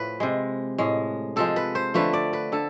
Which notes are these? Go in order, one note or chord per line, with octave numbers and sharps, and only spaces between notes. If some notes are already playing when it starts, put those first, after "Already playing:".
Already playing: A2 F3 A3 B4
C3 G#3
A2 G#3
C3 F3 G#3 A4
B4
C5
D3 F3 A3 B4
D5
B4
D3 A4